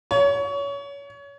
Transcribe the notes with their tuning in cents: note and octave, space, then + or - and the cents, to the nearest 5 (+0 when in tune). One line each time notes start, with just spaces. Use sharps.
C#5 +25